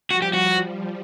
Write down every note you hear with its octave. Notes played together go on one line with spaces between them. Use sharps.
F3 G3 F#4
G4
F#4
F3 G3